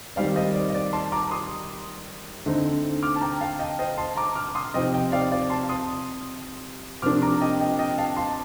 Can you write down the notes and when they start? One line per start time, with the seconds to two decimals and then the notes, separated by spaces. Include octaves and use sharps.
0.16 D#3 G3 C4 D5 F5
0.35 C5 D#5
0.54 D5
0.70 D#5
0.74 D5
0.93 A5 C6
1.12 A#5 D6
1.31 C6 D#6
2.46 D3 A3 C4 D#4
3.03 D6 F6
3.16 A5
3.21 G5 A#5
3.40 F5 A5
3.59 D#5 G5
3.79 C5 D#5
3.98 A5 C6
4.17 A#5 D6
4.35 D6 F6
4.55 C6 D#6
4.74 C3 F3 C4 D#4 D#5 G5
4.93 D#5 G5
5.12 D5 F5
5.32 D5
5.50 A5 C6
5.69 C6 D#6
7.02 C3 F3 A#3 D4 D6 F6
7.22 A#5 D6
7.41 D#5 G5
7.60 D#5 G5
7.79 D#5 G5
7.98 F5 A5
8.17 A5 C6